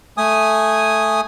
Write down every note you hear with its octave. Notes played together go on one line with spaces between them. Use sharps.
A3 G#5 D#6